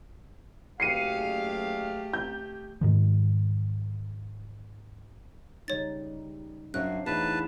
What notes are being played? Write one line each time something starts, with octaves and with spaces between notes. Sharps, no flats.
F#1 A3 G4 G#4 F5 C7 C#7 D#7
G6
G#2 D#3 F3
C#3 G3 D#4 C#5 A6
F#2 F#3 D4 C5 F5 F#6
E2 A3 D#4 B4 C#5 A5